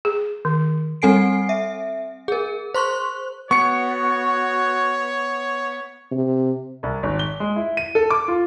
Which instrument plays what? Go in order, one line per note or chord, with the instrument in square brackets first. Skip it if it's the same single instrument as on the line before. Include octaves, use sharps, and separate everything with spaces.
[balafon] G#4
D#3
[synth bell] G3 C4 A4 G#5 C7 D7
E5
G#4 A#4
C5 C6 C#6 F#6
[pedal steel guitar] B3 [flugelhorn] F#4 [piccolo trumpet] C#5 [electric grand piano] C#6 C#7
[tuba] C3
[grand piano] C2
G#1
G7
G#3
E4
D#7
A4
D6
F4